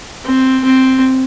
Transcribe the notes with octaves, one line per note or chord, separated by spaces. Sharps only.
C4
C4